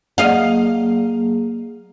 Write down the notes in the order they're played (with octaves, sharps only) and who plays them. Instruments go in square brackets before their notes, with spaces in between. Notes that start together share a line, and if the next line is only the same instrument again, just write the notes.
[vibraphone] F#3 A#3 G#4 [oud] D#5 F5